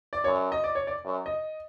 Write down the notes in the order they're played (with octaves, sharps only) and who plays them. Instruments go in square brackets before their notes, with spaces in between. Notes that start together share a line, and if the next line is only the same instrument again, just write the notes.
[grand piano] D5
[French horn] F#2 [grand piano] C#5
[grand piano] D#5
D5
C#5
D5
[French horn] F#2
[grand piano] D#5